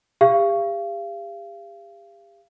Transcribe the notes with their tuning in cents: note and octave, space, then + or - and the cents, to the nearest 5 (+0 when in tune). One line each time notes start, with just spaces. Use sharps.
G4 +40 F5 -35